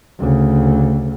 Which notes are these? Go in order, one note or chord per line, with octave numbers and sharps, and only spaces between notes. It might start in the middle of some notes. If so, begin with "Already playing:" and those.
D2 C#3